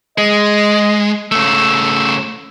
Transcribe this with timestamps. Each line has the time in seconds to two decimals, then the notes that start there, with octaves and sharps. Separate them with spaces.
0.18 G#3 D#5
1.32 C#3 A3 E6